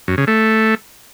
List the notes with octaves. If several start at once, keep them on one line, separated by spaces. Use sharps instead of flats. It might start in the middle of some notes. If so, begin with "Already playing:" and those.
F#2
C#3
A3